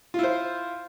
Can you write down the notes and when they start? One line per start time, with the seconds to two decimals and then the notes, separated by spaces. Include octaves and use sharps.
0.14 F4
0.19 E4
0.23 C5